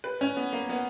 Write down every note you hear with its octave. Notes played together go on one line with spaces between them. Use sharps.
B4
C#4
B3
A#3
B3